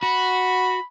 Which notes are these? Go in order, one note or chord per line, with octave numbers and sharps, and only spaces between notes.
F#4 B5